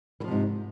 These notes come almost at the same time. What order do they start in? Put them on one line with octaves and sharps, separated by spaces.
E3 F3 C3 G#2